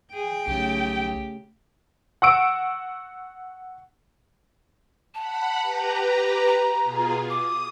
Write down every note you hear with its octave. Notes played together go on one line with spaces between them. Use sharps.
G#4 G5
B1 C#3 A3 G4
F#5 C#6 E6 D7
F#5 A5 B5
G4 B4 A#5
A#5
B2 F4 G#4
D6 D#6